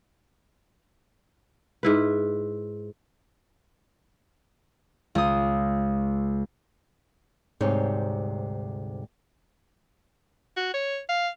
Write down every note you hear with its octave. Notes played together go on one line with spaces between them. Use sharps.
G#2 E4 B4
C#2 D#6
D2 G#2 C3 G3 D#4 C#5
F#4
C#5
F5